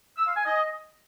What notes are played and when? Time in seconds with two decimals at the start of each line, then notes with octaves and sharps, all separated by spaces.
0.17 E6
0.26 F5
0.36 G#5
0.45 D#5